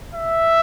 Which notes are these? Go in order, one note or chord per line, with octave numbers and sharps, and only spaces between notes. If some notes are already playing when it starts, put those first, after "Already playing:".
E5